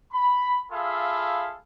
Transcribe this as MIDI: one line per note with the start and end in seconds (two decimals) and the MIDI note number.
0.13 0.61 83
0.71 1.55 65
0.71 1.55 68
0.71 1.55 69
0.71 1.55 76
0.71 1.55 77
0.71 1.55 83